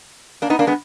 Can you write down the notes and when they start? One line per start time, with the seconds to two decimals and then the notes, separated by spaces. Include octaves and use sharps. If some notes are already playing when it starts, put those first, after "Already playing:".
0.42 A#3 D4
0.50 B3 D#4
0.59 A#3 D4
0.67 G#3 B3